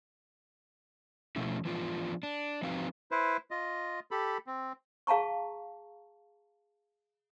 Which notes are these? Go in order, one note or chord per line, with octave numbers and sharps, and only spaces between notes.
B2 F3 A3 C#4 E4
E3 F3 B3 D4 F4
D4
F3 C4 D#4 F#4 B4 F5
E4 B4 C5
F4 D#5
G4 A4 B5
C4
G#4 F5 A5 A#5 C#6